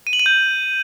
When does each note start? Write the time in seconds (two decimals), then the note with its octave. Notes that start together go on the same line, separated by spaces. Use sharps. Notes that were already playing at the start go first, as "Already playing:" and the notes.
0.07 D#7
0.13 F#7
0.19 D#7
0.26 G6